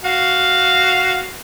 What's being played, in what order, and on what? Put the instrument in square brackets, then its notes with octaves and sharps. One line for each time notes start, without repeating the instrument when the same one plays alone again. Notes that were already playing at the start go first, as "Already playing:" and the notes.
[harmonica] F#4 F5